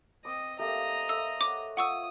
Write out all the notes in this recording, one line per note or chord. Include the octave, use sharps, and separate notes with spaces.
C4 D#5 D6
A3 A#3 G4 D#5 A#5
A3 E6
C#5 F#5 D6
F4 C#5 F#5 C#6 D#6 E6